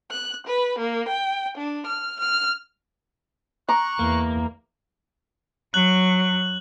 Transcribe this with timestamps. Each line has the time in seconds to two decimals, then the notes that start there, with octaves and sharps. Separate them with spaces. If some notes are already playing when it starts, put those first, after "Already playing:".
0.11 F#6
0.46 B4
0.78 A#3
1.08 G5
1.57 D4
1.85 F6
2.19 F6
3.69 A#5 C#6 D6 F#6
3.99 E2 A#3
5.74 F#3 F#6 F#7